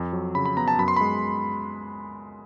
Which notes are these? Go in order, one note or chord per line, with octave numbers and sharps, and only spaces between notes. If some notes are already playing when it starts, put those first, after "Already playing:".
Already playing: F2
F#3
C#3 B5
B5
B3 A#5
A5
F#2 B5
C6
G#3 B5